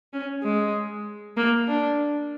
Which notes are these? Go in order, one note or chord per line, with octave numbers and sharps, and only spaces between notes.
C#4
G#3
A#3
D4